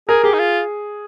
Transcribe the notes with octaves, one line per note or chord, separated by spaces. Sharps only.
G#4 A#4
G4 G#4
D#4
F4